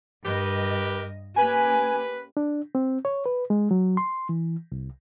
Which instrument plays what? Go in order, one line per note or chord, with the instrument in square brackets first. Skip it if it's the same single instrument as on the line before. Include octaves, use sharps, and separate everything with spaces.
[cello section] G2 D#5 [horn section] G4 A#4 B4
[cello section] A#3 C#4 G4 [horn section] B4 [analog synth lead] G#5
[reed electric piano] D4
C4
C#5
B4
G#3
F#3
C6
E3
C2